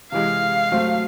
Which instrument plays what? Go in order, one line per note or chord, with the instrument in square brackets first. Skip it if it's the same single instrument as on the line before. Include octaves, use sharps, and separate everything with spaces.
[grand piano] C3 E3 G#3 [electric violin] F5
[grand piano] F#3 A3 C4